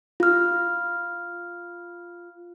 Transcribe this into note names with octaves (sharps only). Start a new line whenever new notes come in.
F4 F6